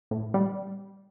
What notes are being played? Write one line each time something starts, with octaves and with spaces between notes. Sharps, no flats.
A2
G3